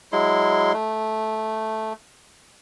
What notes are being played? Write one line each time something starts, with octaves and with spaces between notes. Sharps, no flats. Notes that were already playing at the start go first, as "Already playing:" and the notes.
F#3 G#3 E4 C6
A3